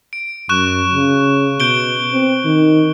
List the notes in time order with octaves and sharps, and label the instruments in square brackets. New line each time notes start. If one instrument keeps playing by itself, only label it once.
[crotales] D7
[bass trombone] F#2 [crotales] C#6 F#6 E7
[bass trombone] C#3
[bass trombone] B2 [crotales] G6 D7 G7
[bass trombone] C4
D#3